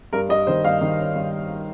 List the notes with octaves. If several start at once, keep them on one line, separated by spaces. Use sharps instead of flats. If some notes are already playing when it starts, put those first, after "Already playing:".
G2 A#4
G2 D#5
D#3 C5
G2 F5
D#3
C#4
G2